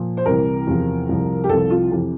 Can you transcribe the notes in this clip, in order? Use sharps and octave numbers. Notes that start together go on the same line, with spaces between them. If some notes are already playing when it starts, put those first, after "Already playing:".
Already playing: A#2 F3
C5
C2 C3 E3 A#4
E2 C3 F3
C2 C3 F3
G4
C2 C3 F3 A4
F4
F2 C3 E3